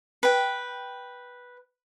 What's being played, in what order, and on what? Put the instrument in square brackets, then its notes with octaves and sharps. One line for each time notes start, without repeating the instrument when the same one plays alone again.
[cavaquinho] B4 G5